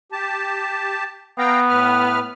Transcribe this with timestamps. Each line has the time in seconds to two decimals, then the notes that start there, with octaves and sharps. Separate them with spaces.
0.12 G4 A5
1.38 B3 F5 G5 A#5
1.69 A2 B4 F6